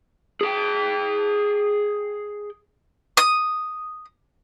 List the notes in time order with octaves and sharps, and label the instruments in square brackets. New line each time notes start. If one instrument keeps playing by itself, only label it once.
[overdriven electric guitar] G#4 G5
[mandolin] D#6